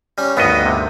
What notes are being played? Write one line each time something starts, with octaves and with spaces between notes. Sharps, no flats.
G3 C#4
D2 G2 D#3 B3 D#5
C3